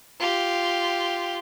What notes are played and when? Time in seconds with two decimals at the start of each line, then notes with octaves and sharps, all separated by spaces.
0.20 F4 G4